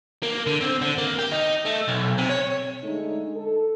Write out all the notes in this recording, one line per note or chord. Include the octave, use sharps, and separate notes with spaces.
A#3
D3
C4
D3
A#3
G4
D#4
A3
B1
C3
C#5
D3 G#3 A3 D#4
A4